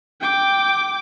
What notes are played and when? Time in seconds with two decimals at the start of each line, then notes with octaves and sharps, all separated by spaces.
0.21 G5 D6